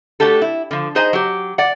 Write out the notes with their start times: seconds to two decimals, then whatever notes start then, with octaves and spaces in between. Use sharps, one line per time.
0.20 A3 D4 F#4 G4 A4
0.42 E4
0.71 D3 F3
0.95 D#4 G#4 C5 D#5 G#5
1.13 F#3 G4
1.58 D5 F#5